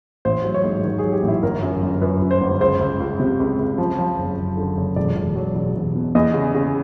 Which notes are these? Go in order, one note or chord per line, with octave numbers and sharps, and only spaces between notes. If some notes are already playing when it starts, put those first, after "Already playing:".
A1 C5
F#3
C#5
G#2
D#3
G#4
F#3
G4
A1
E4
G1 A#4
F#2
G1
F#2 B4
F#2
C5
G1
C#2 C5
C#2
C#2
C3
C#2
C#2
F3
F3
F#1
F#1
D3
F#1
E1 D5
E1
F#3
E1
E1
B2
E2 D#5
C#3
C#3